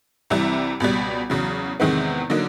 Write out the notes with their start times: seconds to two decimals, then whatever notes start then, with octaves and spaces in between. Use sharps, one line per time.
0.30 C2 C3 E3 G3
0.80 C#2 B2 G3
1.30 E2 C#3 F#3
1.80 E2 C3 D#3 G#3 B3
2.30 D3 F#3 A#3 D#4